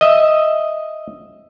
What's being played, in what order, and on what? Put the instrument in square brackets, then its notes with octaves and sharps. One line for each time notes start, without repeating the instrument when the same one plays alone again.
[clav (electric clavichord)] D#5 E5